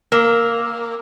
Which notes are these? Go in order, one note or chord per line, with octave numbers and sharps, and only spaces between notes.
A#3 A#4